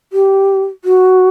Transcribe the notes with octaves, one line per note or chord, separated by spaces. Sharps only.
G4
F#4